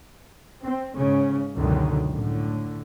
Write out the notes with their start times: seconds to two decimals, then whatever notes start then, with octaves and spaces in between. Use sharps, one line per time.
0.63 C4
0.97 G#2 C#3 C#4
1.56 C#2 F#2 B2 D3 D#3
2.13 A2 D3